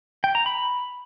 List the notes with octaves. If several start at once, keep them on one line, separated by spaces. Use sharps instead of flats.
G5
A#5
B5